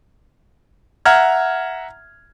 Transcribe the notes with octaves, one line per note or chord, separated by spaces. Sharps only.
E5 F#5 A#5 F6 G#6